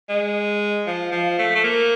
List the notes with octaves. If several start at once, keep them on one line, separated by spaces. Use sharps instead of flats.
G#3
F3
F3
A3
A3
A#3